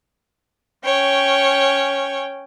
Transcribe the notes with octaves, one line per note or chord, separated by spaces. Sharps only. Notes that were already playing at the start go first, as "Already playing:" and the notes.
C#4 C#5 G5